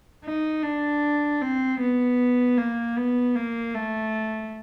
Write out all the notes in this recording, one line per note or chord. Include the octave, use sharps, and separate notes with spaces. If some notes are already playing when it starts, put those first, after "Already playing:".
D#4
D4
C4
B3
A#3
B3
A#3
A3